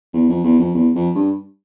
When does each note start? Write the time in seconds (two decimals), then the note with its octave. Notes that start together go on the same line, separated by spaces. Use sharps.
0.14 E2
0.29 F2
0.44 E2
0.59 F2
0.75 E2
0.95 F2
1.15 G2